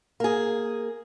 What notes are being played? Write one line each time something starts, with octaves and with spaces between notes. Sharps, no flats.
A#3 G#4